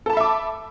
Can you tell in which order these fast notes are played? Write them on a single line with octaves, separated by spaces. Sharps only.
A4 A5 B5 E5 D6